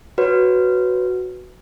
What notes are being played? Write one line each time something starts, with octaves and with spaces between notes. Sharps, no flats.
F#4 B4 C#5